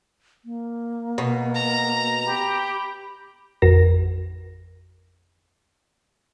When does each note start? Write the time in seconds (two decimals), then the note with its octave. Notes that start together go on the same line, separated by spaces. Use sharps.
0.45 A#3
1.18 B2
1.55 A#5
2.25 G4 B5
3.62 A1 F2 F#4 A#4 A#6